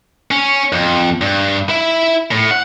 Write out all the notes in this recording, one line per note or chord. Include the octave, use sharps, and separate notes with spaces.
C#4
F2
G2
E4
A2
F#5